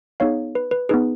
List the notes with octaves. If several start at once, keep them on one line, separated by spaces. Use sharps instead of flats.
B3 D#4 G#4 C#5 F5
B4
B4
B3 D#4 G#4 B4